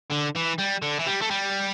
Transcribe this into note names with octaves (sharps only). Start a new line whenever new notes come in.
D3
E3
G3
D3
E3
G3
A3
G3